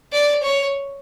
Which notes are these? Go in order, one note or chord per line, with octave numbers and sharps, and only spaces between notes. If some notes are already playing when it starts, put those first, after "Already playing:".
D5
C#5